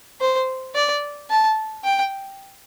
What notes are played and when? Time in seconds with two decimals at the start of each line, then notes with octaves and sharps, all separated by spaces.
0.21 C5
0.75 D5
1.30 A5
1.84 G5